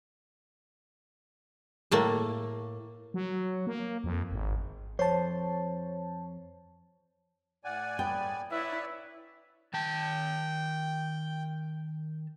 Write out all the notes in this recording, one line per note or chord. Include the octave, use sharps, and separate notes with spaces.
A2 A3 A#3
F#3
A#3
F2
G#1
F2 C5 C#5 A5
A2 D5 F#5 G#5
B3 G5
E4 B4 C#5 D5 E5
D#3 G5 A5